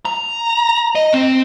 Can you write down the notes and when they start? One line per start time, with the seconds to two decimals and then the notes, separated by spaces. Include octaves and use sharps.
0.05 A#5
0.95 D#5
1.14 C4